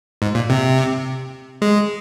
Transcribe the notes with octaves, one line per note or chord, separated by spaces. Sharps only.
G#2
A#2
C3
G#3